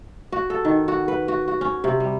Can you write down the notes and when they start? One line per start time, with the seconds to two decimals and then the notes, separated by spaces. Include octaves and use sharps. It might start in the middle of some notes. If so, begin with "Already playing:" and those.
0.32 F#4
0.50 A4
0.65 D#3
0.88 F#4
1.08 B4
1.28 F#4
1.48 F#4
1.61 C#4
1.84 C3
2.00 G3